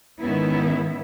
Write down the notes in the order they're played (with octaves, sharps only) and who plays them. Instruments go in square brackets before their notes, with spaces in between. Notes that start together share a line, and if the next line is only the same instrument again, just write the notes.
[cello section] G#2 D#3 B3 C#4 E4 E5